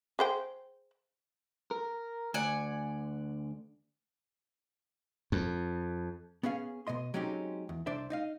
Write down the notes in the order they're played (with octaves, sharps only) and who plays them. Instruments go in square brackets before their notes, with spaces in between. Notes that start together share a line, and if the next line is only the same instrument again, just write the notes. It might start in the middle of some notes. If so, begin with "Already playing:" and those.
[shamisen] G#4 C5 G5
[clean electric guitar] A#4
[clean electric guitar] D2 [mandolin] D5 F#5 G#5
[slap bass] F2
[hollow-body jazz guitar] B3 C#4 G#4 F5 G#5
B2 B3 D#5 C6
F#3 G#3 C4 C#4 D#4 G4
E2
C2 D4 C5 D5 E5
D#4 D#5 F5